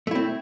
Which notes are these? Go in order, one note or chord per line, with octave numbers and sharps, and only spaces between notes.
A3 C4 E4